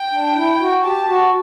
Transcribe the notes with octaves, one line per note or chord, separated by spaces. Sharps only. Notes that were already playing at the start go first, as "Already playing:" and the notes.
Already playing: G5
D4
E4
F#4
G4 A5
F#4